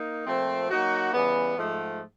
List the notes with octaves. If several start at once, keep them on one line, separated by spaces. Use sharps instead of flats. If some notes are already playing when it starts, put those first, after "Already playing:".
Already playing: A#3 D#4
A#2 F3 A3 C4
F#3 A#3 D#4 F#4
C#3 E3 G3 B3
G#2 F3 A3